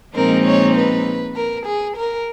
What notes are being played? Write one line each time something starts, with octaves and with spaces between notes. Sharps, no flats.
A#2 F3 G#3 C4 D#4 A#4
C#5
B4
A#4
G#4
A#4